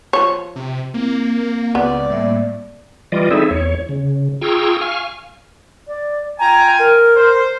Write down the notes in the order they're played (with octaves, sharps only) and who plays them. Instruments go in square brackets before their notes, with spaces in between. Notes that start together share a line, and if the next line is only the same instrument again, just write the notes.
[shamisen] F3 C#5
[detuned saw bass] C3
[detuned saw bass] A#3 [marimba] C4 E4
[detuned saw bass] C#2 [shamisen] B3 [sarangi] D5
[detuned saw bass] A2 [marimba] G3 A#3 E5
[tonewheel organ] E3 G3 F4 D5 D#5
C4 D#4 E4 G#4 A4 E5
E2 C#5
C#3
F4 G#4 G5 A#5 C#6 E6
F5 G#5 C#6 F6
[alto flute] D5
[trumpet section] F4 G5 G#5 [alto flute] A#5
[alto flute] A#4
[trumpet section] C5